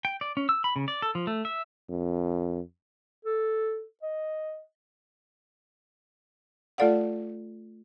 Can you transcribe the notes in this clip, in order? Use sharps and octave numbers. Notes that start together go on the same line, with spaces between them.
G5
D5
C#4
E6
B5
C#3
D5
A4
F3
A3
E5
F2
A4
D#5
A3 F4 A4 D5 F5 F#5